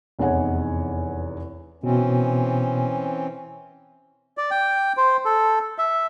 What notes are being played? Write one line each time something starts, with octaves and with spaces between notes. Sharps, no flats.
F1 E2 D#4 C#5 F#5 G#5
B2 E3 C4 C#4
D5
G5
C5
A4
E5